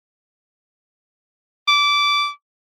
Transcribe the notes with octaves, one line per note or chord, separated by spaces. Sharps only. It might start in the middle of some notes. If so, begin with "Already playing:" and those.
D6